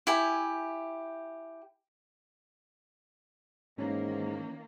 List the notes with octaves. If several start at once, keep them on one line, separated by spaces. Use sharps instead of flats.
E4 G4 G#5
G#2 D#3 E3 A#3 C#4